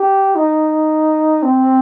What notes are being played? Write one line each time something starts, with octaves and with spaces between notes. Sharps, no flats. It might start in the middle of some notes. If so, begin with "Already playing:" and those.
Already playing: G4
D#4
C4